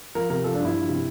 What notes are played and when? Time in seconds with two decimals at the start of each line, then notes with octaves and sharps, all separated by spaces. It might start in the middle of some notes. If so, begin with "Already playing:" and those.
0.15 F3 A#4
0.30 C3 A#4
0.44 F3 A4
0.54 D4
0.60 G2
0.65 E4
0.74 F3
0.89 C3